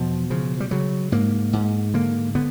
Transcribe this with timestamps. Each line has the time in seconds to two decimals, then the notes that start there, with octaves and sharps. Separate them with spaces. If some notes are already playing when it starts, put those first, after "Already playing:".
Already playing: E2 B2 F3
0.30 C#3 F3
0.60 G3
0.71 C#3 F#3
1.12 G#2 A#3
1.53 G#2
1.94 D3 A#3
2.35 D3 B3